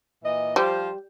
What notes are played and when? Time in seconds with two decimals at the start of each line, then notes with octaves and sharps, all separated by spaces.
0.23 A#2 E3 D#5
0.56 F3 G3 F4 C5